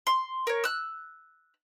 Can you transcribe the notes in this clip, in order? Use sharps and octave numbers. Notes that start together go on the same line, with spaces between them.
C6
A#4 C#5
E6 F#6